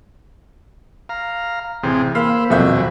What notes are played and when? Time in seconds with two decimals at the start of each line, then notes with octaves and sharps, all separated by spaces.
1.09 F5 A#5
1.83 A1 C3 C4 G#4
2.15 A#3 C5 F5 B5 E6
2.50 D#1 F2 B2 F#3 E5 G6